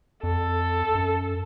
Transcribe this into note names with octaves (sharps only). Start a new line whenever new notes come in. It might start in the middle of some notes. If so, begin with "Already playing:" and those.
F2 A4
F#2